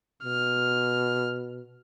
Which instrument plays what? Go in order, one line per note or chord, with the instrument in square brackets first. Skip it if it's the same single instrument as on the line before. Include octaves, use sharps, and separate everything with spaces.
[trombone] B2 [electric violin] F6